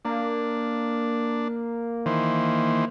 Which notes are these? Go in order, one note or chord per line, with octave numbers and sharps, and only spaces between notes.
A#3 D4
D#3 E3 C5